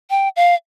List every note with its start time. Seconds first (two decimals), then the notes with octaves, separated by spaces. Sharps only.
0.10 G5
0.36 F5